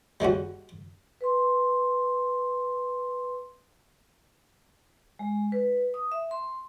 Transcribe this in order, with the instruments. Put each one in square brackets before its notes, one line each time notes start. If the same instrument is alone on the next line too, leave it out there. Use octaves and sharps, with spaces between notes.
[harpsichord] G3 G#3 C#4 F#4
[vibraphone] B4 C6
G#3
B4
D#6
E5
C6